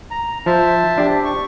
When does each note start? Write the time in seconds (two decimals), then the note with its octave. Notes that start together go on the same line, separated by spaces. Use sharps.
0.11 A#5
0.46 F3 C5 E5 A5
0.98 D4 G4
1.25 C#6